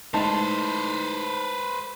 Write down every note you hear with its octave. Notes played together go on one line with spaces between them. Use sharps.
G#3 A3 D#4 E4 B4 C5 A5